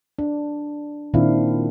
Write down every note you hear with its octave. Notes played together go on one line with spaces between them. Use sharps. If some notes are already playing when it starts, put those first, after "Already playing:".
D4
A#2 D#3 C4 D4 E4 F5